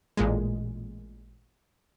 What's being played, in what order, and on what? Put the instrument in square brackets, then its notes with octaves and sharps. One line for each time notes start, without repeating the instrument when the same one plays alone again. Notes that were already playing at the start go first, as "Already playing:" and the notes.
[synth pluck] A1 A#2 G#3